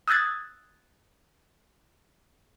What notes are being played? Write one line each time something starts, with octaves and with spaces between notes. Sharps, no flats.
D#6 E6 F#6 G#6 A6